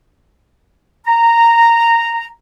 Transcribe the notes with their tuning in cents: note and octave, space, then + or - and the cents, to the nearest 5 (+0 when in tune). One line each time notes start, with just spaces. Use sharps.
A#5 -10